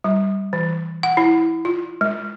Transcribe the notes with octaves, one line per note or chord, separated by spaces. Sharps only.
G3
E3
F#5
E4
F4
G#3